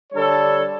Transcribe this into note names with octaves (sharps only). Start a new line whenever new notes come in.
D3 G3 D4 A4 C#5